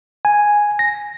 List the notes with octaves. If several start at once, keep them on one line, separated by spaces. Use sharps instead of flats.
G#5
A#6